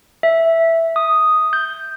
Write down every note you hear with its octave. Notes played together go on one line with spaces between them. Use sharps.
E5
D#6
G6